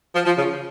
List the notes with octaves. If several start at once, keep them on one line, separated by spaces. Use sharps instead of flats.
F3
F3
C#3